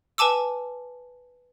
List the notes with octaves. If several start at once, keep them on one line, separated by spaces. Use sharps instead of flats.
B4 G#5 A5 D6 E6